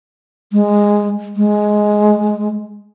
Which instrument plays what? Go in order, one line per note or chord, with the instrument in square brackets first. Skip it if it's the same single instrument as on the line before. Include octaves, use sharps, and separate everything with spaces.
[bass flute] G#3
G#3